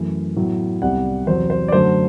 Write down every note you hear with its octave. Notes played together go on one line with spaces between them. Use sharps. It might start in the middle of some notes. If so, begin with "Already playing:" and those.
Already playing: F#2 E3 A3
A2 F#3 B3
C2 C3 G3 B3 F#5
E2 C3 F#3 C5
C5
D5
F#2 D3 F#3 A3 C5